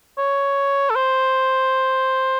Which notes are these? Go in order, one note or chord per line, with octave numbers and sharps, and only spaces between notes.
C#5
A4
C5